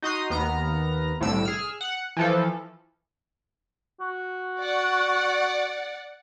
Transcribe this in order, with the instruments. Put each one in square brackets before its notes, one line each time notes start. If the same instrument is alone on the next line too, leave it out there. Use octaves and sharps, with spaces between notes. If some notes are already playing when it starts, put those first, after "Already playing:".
[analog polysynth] D#4 F#4 D#5 A#5 C6 D#6
D#2 B3 A#5 F6 A#6
C2 A2 D3 E6 D7
G#4 E6 F6
F#5
E3 F3 A4
[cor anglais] F#4
[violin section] D5 F#5